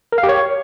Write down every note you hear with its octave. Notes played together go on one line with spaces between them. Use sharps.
A#4
F5
G4
C#5